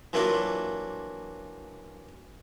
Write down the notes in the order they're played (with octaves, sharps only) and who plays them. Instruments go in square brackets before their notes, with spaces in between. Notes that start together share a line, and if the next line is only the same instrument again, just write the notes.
[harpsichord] E3 F#3 A#3 D4 E4 F4